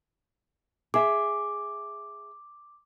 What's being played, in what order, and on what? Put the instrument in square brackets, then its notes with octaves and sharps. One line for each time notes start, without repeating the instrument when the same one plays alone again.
[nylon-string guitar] G#4 E5 [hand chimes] D6